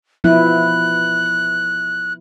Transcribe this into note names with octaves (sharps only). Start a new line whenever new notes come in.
F3 B3 E4 F#6